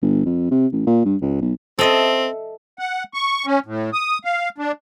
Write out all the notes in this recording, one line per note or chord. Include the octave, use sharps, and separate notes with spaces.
G1
F2
C3
A1
A#2
G2
C#2
B1
C4 A4 D#5 E5
F#5
C#6
C#4
A2
D#6
F5
D4